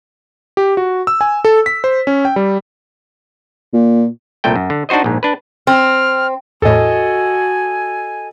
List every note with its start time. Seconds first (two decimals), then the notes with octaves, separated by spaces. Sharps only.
0.57 G4
0.77 F#4
1.07 E6
1.21 G#5
1.45 A4
1.66 B6
1.84 C5
2.07 C#4
2.25 G5
2.36 G3
3.73 A#2
4.44 C2 A#2 A3 G5
4.55 F#2
4.70 D3
4.89 D4 D#4 F#4 C5 D#5
5.04 A#1 G#2
5.23 D4 B4
5.67 C4 F6
6.62 E2 A2 F#4 A4 D#5 G#5